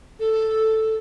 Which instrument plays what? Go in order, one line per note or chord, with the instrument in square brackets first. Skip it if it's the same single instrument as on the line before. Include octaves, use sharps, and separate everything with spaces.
[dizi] A4